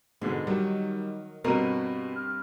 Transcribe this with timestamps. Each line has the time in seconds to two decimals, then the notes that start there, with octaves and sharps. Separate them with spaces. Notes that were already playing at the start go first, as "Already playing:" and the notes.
0.22 G#2 B2 D3 G#3
0.47 D#3 F#3 G3
1.44 G2 B2 C4 A#4 D#7
2.16 F6